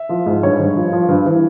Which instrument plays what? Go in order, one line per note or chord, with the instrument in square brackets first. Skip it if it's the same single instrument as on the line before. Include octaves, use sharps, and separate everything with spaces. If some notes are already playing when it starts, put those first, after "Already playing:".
Already playing: [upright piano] E5
F3
G#2
G2 C#5
G2
F3
F3
G2
E3